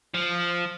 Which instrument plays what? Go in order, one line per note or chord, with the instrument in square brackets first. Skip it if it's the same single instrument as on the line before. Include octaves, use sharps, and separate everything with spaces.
[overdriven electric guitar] F3